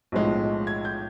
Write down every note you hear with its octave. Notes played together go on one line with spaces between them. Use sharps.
B1 A2 F3 G#3
G#6
G6